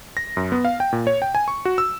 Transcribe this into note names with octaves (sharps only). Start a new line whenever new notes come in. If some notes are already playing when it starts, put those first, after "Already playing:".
A#6
F#2
B3
F5
G5
A#2
C#5
G5
G#5
C#6
F#4
E6